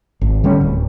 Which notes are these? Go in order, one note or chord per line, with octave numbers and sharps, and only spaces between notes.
G#1
D3 G3 A3 C#4
D1